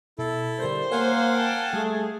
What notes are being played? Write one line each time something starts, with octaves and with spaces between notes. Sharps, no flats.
B2 E4 A4
D3 G3 A#4 C5 G6
A#3 A#4 C#5 F5 F#5 G#5
G5 A5
G3 A3 G#4